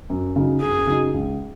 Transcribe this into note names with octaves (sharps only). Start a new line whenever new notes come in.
F#2
C#3 F#3 D#4
F#2 G#4
C#3 F#3 D#4
C#2